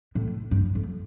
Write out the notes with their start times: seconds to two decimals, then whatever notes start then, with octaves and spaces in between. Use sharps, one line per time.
0.15 A2
0.51 G2
0.75 F2